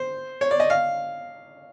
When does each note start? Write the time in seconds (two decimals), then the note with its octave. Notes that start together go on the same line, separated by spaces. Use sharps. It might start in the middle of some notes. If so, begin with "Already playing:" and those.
Already playing: C5
0.41 C#5
0.51 D5
0.60 D#5
0.70 F5